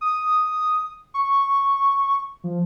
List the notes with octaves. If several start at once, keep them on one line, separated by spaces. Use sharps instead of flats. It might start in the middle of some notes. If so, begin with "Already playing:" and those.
D#6
C#6
F3